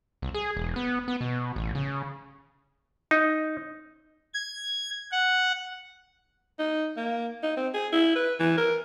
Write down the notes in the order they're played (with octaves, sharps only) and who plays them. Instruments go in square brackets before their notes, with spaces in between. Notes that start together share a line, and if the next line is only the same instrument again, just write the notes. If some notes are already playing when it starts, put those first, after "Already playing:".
[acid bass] C2
G#4
E1
B3
B3
B2
A1
C#3
[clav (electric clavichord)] D#4
[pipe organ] G#6
F#5
[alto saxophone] D#4
A#3
D#4
C4
G#4
E4
B4
E3
A#4